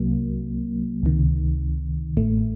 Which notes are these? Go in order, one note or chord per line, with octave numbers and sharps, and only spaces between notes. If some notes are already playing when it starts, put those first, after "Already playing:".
Already playing: C2 C3 F#3 A#3
C#2 C3 D#3
A1 A2 A3